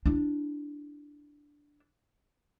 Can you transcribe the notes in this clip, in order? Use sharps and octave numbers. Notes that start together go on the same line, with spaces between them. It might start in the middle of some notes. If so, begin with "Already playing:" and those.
D4 E4